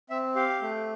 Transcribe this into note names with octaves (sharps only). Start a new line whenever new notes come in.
C4 E5
G4 F5
A3